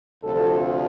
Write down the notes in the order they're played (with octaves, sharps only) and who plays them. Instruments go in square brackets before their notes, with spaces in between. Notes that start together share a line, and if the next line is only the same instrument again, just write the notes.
[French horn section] D2 C3 F3 A4